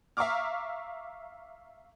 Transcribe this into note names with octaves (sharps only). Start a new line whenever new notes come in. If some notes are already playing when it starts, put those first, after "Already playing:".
E5 F5 A#5 C#6 D6 F6